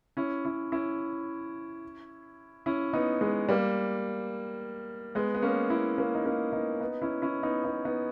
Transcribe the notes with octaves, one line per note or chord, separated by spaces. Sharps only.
C#4 E4
C#4 E4
C#4 E4
C#4 E4
B3 D#4
G#3 B3
G3 A#3
G#3 B3
B3
A#3 C#4
C#4 E4
A#3 C#4
D#4
A#3 C#4
B3 D#4
B3 D#4
C#4 E4
C#4 E4
B3 D#4
B3 D#4
B3 D#4